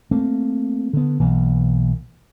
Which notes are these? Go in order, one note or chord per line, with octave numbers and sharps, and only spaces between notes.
A3 A#3 C4
D3 B3
B1 E3 A#3